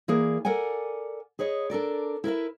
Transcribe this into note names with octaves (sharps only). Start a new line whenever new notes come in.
E3 A#3 G#4 A#4 D5
A4 A#4 D5 F#5 G#5
G#4 B4 C#5 D#5
D4 A4 A#4 D5
E4 A#4 B4 E5